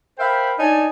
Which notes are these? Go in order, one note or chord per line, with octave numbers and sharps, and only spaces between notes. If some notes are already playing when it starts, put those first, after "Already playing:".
A#4 C5 E5 F5 G5 B5
D4 D#4 C#5 G#5 A5